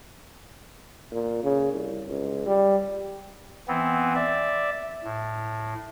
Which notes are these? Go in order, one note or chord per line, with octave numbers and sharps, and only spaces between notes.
A#2
C#3
C2
C#2
G3
E3 B3 C4
D5 E5
A2